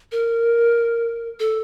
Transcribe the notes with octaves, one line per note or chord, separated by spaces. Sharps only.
A#4
A4